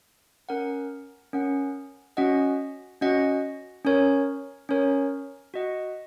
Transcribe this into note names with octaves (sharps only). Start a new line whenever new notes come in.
C#4 A#4 F#5
C#4 A#4 F#5
C#4 F#4 D#5 F#5
C#4 F#4 D#5 F#5
C#4 A#4 C#5
C#4 A#4 C#5
F#4 D#5 F#5